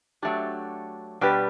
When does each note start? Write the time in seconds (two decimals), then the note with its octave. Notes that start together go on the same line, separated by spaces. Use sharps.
0.23 F#3 A3 D4 G4
1.21 B2 G3 D4 G4 B4